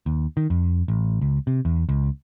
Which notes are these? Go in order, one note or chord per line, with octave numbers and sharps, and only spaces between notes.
D#2
D#3
F2
A1
C#2
C3
E2
C#2